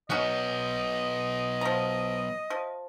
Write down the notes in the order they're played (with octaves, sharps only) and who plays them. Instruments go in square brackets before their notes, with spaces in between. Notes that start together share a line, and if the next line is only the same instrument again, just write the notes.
[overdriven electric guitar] F#3 B3 [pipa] C#4 D#4 F#5 [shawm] D#5
[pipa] F3 A#5
F3